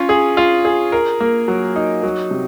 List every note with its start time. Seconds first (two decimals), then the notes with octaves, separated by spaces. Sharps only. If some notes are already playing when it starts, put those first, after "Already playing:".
Already playing: C#4 F4
0.09 G#4
0.37 F4
0.65 G#4
0.92 A#4
1.20 A#3
1.48 F#3
1.76 D#4
2.03 F#3
2.31 C3